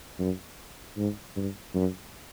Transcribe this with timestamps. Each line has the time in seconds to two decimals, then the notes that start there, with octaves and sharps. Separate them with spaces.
0.19 F#2
0.97 G#2
1.36 G2
1.75 F#2